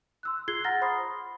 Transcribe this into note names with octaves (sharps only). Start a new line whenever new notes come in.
C6 E6 F#6
F4 G#4 F#6 G#6 C7 G7
F#5 A#5 F6 A6 A#6
C5 B5 C6 D#6 C7